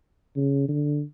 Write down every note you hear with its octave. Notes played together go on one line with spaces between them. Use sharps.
C#3
D3